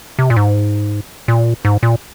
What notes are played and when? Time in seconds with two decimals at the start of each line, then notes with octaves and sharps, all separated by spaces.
0.19 C3
0.30 A#2
0.36 G#2
1.28 A#2
1.65 G#2
1.83 A#2